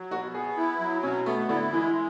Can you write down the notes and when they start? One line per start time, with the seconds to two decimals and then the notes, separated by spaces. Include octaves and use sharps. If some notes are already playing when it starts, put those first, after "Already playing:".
Already playing: F#3
0.10 B2 F#4
0.34 B3 G#4
0.57 E4
0.80 F#3
1.03 B2 C#4
1.26 A3 B3
1.49 D3 E4
1.73 E3 G#3